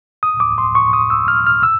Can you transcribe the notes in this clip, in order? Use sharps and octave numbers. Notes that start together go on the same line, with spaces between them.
D#6
D6
C6
C#6
D#6
E6
F6
F6
E6